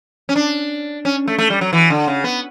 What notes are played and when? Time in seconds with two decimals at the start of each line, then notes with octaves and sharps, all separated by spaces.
0.29 C#4
0.36 D4
1.05 C#4
1.28 A3
1.38 A3
1.50 G3
1.61 F#3
1.73 E3
1.90 D3
2.07 C#3
2.24 B3